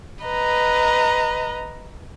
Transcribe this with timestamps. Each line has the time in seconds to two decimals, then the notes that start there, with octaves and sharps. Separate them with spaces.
0.24 B4 D#5 A#5